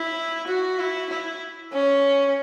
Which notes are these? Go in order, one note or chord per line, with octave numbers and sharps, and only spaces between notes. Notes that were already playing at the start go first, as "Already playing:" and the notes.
Already playing: E4
F#4
E4
E4
C#4